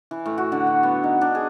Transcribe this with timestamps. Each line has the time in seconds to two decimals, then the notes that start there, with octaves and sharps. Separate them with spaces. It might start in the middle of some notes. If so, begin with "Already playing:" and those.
0.11 E3
0.26 A2
0.38 F#4
0.52 D3
0.67 F#5
0.83 B3
1.04 D#4
1.21 D4
1.35 G#4